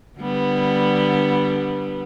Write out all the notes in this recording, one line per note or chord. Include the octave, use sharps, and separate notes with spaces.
D3 G3 B3